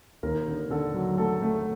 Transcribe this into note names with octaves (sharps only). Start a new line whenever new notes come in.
D#2 A#4
D3
D3 A4
F#3
A3 A4
A3